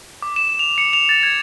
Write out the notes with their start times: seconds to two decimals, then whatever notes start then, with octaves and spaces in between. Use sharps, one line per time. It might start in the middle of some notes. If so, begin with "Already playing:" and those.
0.22 D6
0.36 E7
0.59 F7
0.78 C#7
0.93 F7
1.09 A6
1.23 G#6